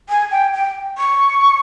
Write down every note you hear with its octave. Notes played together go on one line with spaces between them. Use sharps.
G#5
G5
G5
C#6